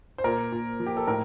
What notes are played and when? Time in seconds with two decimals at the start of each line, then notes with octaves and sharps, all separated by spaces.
0.18 C5
0.24 A#2 A#4
0.52 A#2
0.80 F3
0.86 G4
0.97 A4
1.08 A2 A#4